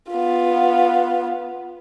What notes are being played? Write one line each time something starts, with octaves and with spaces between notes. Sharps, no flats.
B3 F4